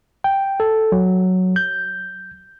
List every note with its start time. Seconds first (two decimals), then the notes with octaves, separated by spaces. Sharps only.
0.24 G5
0.60 A4
0.92 F#3
1.56 G6